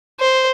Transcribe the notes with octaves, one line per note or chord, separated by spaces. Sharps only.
C5